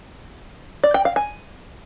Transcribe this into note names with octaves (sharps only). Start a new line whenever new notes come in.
D5
G5
F5
G#5